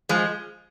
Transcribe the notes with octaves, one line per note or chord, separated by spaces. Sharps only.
F3 G#3